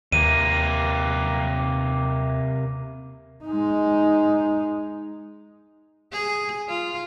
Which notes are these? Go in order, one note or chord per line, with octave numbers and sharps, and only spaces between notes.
D#2 C3 A#3 D#7
G#3 D#4
G#4
F4